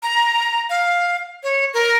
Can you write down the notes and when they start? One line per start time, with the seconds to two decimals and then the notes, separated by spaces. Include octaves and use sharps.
0.03 A#5
0.70 F5
1.43 C#5
1.74 A#4